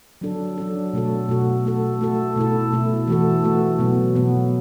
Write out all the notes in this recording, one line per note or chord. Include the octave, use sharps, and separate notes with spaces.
F#3 D4 A4
F#3 D4 A4
B2 A3 F#4 A4
B2 A3 F#4 A4
A3 F#4 A4
A3 F#4 A4
B2 A3 E4 A4
B2 A3 E4 A4
E3 A3 F#4 A4
E3 A3 F#4 A4
B2 F#3 B3
B2 F#3 B3